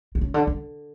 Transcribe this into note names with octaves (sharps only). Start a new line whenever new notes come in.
D3
C#3
D3
D3